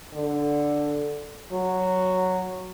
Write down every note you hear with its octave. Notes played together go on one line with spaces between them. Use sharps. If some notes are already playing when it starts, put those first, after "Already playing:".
D3
F#3